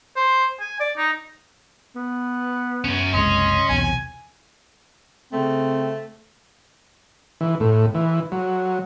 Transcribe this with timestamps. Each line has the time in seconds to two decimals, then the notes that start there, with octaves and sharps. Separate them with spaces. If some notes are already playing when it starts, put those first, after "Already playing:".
0.16 C5
0.60 G#5
0.80 D5
0.97 D#4
1.96 B3
2.85 F#2 C#4
3.14 F#1 C2 G#3 C#4 D#5 C6
3.69 B1 E2 C3 G#5
5.33 C#3 A3 C4
7.41 E3
7.60 A2
7.95 E3
8.32 F#3